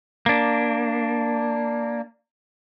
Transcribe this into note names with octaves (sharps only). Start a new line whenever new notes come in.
A#3 D4